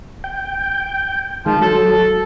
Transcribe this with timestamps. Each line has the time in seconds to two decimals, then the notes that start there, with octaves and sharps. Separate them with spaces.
0.24 G5
1.46 D#3 F3 G#3
1.61 F#3 A4